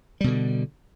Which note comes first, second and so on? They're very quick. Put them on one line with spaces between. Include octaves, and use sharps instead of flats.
G3 B2 D3